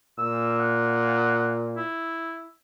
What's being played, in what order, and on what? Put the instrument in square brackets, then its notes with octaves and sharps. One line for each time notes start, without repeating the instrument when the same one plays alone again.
[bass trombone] A#2 [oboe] E6
[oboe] F#5
E4